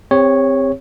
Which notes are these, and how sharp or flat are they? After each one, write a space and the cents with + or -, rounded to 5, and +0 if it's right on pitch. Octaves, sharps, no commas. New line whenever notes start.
C4 +0 G4 +35 C#5 -5